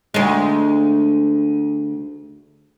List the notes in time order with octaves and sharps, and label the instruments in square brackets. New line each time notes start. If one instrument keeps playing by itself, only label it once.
[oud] D2 G#3